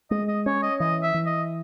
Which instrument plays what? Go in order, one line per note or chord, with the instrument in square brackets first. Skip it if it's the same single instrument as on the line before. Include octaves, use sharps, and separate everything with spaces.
[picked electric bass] G#3 [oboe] D#5
[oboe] D#5
[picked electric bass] C#4 [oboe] C#5
[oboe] D#5
[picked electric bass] E3 [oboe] D#5
[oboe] E5
[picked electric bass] E3
[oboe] D#5